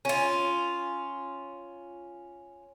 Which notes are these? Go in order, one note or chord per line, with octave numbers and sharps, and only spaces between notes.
C#4 F4